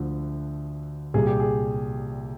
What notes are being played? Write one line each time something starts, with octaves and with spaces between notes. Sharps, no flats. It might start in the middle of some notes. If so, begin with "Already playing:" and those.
Already playing: D2 D3 F3
C2 A#2 G3 G#4
G4
G#4